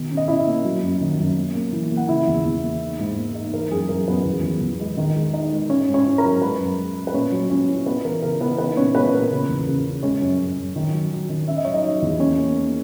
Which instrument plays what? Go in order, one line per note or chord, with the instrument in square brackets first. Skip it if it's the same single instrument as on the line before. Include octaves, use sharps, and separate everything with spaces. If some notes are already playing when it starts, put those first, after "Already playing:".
Already playing: [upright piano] B2 D#3
C#4
D#5
C#4 E4 E5
A#3
F#3
F#2
D#3
F#2
A#3
A#3
E3
A#3
F#5
C#3 E4 E5
E2
E2
A#3
D#4
G#2
A#3
D#4
E3 A#4
F#2 G#4
F#2 A#4
F#2 B3 B4
E2
E2
E2
G#3
D#3
G#3
D#4
G#3
C#4 C#5
G#2
C#4 C#5
E4
A#4 A#5
F#3
G#3 B4 B5
F#2
G#3
G#3
B4
A#2 C#4 C#5
F#3
F#3 C#4 C#5
E4
B3 B4
E3 A#4
C#3 A#4
E3 B3 B4
B3 D#4 B4
A#2 C#4 C#5
G#3 B3 B4
A#2 A#4
C#3
E2
C#3
C#3
G#3 C#4 C#5
F#2
F#2
F#2
D#3
F#3
F#3
D#3
C#4 E5
D#5
F#3 C#5
D#4 D#5
F#3
E2
A#3 C#4 C#5
A#3
A#3